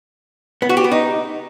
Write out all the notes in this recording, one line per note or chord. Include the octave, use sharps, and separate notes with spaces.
B3
F#4
G4
B3
D#4